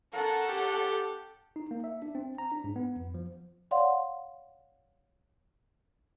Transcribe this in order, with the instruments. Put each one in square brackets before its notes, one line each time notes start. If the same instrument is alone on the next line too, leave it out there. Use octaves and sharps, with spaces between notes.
[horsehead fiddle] C#4 F#5 [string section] A4 [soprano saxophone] A#4
[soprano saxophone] G4
[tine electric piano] D#4
A#3
E5
D4
C4
A#5
D4
G#2
B3
F2
F3
[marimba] C#5 D5 F5 F#5 C6